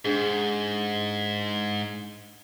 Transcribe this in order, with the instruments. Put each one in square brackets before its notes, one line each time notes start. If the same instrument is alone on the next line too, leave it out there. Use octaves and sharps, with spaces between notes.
[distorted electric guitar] G#2 [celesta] D4 G#4